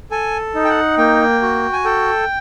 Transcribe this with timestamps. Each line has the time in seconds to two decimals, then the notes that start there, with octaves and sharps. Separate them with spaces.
0.11 A4 G#5
0.55 D#4
0.65 G5
0.69 F#5
0.98 A#3 G5
1.42 F#4
1.73 G#5
1.85 A4 G5